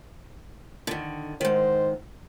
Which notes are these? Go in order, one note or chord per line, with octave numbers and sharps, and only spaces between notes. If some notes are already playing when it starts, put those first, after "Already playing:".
D3 D#3
G#2 D#3 C5